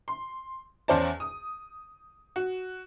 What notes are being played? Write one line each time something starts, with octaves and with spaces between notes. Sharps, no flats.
C6
E2 C#4 C5 D5 A5
D#6
F#4